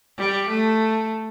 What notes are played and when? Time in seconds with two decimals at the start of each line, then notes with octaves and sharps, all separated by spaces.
0.18 G3
0.49 A3